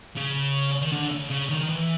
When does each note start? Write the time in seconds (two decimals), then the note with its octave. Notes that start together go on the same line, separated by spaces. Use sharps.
0.16 C#3
0.81 D#3
0.92 D3
1.11 C#3
1.30 C#3
1.49 D#3
1.61 D#3
1.68 E3